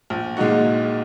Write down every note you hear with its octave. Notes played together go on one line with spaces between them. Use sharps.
A#1
A#2 G#3 D#4 F#4